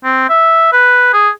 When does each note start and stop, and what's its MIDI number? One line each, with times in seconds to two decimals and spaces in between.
0.04 0.25 60
0.29 0.68 76
0.72 1.13 71
1.13 1.29 68